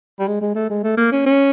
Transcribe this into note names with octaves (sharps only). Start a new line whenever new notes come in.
G3
G#3
G#3
A3
G#3
A3
A#3
C#4
C#4